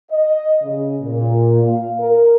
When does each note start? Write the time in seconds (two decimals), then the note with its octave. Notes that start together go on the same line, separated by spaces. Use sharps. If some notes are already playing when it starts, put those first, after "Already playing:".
0.10 D#5
0.62 C#3
1.01 A#2
1.62 F5
2.00 A#4